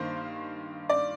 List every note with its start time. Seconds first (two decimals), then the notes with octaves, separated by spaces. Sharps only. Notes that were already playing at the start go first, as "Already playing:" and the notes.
Already playing: G2 D#3 A#3 C5
0.89 D5